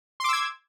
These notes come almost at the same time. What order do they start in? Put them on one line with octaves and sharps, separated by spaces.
C6 D6 E6 G#6